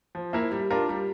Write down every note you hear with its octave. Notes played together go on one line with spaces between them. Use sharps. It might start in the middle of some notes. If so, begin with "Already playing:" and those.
F3
A#3 E4 A#4
G3
D4 F4 A#4
G3